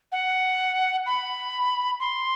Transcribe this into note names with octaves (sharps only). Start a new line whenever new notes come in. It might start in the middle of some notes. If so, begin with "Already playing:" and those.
F#5
B5
C6